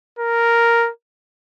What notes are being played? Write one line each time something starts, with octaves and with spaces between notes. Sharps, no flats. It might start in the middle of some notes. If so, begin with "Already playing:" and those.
A#4